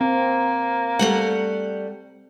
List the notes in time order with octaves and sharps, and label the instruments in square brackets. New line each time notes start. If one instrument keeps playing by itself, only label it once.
[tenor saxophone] A#3 [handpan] C4
[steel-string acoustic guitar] G3 A3 F#5